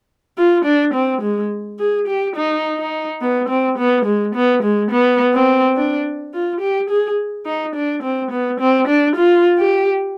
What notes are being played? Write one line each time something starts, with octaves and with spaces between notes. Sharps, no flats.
F4
D4
C4
G#3
G#4
G4
D#4
D#4
B3
C4
B3
G#3
B3
G#3
B3
C4
D4
F4
G4
G#4
D#4
D4
C4
B3
C4
D4
F4
G4